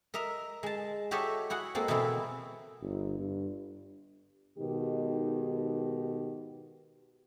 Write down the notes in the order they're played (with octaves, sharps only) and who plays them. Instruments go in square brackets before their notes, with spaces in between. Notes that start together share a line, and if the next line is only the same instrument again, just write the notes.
[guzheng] A#4 D#5 E5 A#5
G#3 A5
F#4 G4 A4 C#5 D#5 E5
E4 F#4 G#4 F#5
G#3 A#3 C4 A4
B2 E3 B3 C4 E4
[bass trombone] G1
G2
[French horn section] G#2 B2 D#3 G4